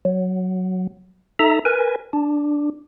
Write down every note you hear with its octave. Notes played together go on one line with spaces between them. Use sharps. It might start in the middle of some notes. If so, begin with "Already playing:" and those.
F#3
D#4 A4 E5 A#5
A#4 B4 G#5
D4